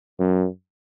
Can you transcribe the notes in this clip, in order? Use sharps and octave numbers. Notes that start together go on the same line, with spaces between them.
F#2